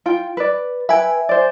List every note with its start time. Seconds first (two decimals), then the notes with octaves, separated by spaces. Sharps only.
0.06 F4 G5
0.37 B4 D5
0.89 B4 E5 G5 G#5
1.29 C5 D5